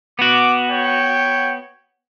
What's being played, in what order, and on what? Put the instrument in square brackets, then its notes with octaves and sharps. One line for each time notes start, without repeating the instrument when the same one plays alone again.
[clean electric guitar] B3 F#4 [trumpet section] D6
[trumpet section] C#5 G5